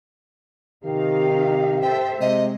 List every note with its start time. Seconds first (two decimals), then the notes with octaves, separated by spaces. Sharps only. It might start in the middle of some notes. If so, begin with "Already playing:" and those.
0.85 C3 D#3 D#4 G4 F5
1.82 A4 C5 E5 G5
2.21 C3 G#3 D#5